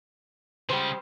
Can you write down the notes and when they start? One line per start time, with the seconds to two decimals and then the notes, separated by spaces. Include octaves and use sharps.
0.69 C#3 G3 G#3 C5